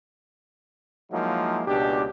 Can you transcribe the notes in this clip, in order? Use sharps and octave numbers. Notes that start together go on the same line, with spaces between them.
F3 F#3 G#3 A#3 D#4 E4
C#2 B2 D4 G4